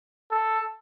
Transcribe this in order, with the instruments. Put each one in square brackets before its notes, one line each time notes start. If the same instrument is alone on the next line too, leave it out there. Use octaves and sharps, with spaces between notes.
[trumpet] A4